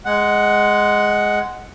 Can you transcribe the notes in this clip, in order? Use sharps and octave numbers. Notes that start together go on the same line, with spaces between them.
G#3 F#5